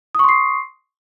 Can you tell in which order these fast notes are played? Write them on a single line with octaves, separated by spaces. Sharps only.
D#6 C#6 C6 C7